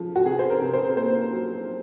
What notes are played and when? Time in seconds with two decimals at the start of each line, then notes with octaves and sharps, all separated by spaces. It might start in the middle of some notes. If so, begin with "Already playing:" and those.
Already playing: C#3 F3
0.16 F#4
0.26 C3 G#4
0.39 C5
0.50 A#4
0.61 C3
0.73 C5
0.97 A#3 C5
1.32 F#3